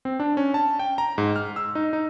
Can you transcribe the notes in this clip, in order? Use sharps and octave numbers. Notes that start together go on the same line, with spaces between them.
C4
D4
C#4
A5
G5
A#5
G#2
F6
E6
D#4
D#4